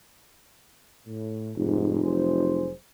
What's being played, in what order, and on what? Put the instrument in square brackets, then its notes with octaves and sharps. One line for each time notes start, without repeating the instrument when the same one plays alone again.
[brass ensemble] A2
[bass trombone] F1 [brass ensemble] G#2
[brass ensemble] F#3 G#4 C5